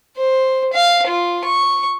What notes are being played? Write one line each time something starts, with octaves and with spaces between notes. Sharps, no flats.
C5
F5
F4
C#6